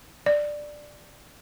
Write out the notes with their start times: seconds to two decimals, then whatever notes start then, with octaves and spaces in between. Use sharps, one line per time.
0.26 D5